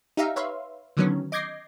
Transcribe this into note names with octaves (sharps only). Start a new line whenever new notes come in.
D#4 G4 E5 F5 A#5
B4 C#5 E5 F5 C6
D3 D#3 F#3 B3 C#4
D#5 D6 G6 G#6 A#6 C7